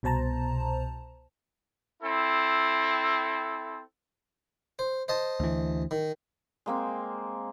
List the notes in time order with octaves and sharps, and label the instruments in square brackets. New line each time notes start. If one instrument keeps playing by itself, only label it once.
[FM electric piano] C2 B2 C5 A5 A#5
[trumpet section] C4 E4 A4
[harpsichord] C5
C5 D#5 A5
[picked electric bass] D2 E3
[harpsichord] D#3
[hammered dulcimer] G#3 A#3 C4